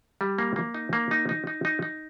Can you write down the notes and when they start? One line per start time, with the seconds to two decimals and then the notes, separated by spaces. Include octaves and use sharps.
0.21 G3
0.38 A#3
0.56 A#3
0.74 D#4
0.93 A#3
1.11 D#4
1.29 D#4
1.47 D#4
1.65 D#4
1.82 D#4